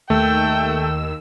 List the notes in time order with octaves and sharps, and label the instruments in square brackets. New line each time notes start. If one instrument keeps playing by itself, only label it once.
[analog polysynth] D#2 D#3 E6 [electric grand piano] A3 [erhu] G5